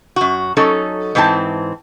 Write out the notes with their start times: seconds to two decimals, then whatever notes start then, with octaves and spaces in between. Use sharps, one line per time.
0.16 F#2 F#4
0.57 F#3 C#4 D#4 A4
1.15 G#2 E3 C4 D4 A5